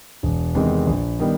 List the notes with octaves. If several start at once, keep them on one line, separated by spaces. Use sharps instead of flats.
E1
E2 C3 D#3 G#3
A#1
D#3 G3 B3